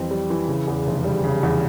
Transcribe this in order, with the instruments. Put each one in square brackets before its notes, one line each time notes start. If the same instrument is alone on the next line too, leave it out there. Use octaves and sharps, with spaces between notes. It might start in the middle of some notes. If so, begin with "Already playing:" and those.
Already playing: [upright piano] F2 E3 G3 C4
G3
E3
C#3
E2
F1
G3
C#3
E2